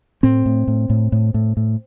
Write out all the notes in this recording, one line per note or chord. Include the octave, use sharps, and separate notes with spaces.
A2 C4
A2
A2
A2
A2
A2
A2